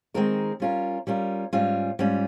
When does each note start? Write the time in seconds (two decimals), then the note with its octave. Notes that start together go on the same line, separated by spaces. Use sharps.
0.14 D#3 G#3 C4 D#4 A#4
0.60 G3 C#4 F4 A#4
1.07 G3 C#4 F4 A#4
1.53 G#2 G3 C#4 F4
1.99 G#2 G3 C#4 F4